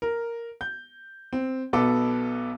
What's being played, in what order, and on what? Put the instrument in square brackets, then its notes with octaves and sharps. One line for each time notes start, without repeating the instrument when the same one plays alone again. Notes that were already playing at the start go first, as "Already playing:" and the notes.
[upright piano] A#4
G6
C4
B1 B2 B3 A4 D6